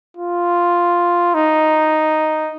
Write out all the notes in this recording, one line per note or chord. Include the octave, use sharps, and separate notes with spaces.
F4
D#4